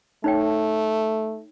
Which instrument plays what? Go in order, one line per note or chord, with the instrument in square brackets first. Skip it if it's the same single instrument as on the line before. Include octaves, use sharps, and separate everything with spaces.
[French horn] A3 [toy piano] D#4 C#5 G5